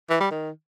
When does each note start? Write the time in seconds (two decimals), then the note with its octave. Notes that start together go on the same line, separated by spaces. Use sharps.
0.10 E3
0.20 G3
0.31 D#3